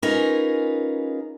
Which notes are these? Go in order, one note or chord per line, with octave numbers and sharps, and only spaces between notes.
C#4 D#4 F4 G#4 A#4 B4